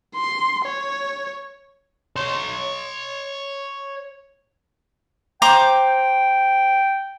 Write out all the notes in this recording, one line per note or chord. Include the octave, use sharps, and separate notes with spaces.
C6
C#5
C#5 C6
C5 G5 A#5 D6